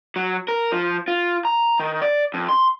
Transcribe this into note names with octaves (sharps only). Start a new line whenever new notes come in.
F#3
A#4
F3
F4
A#5
D#3
D5
F2
C6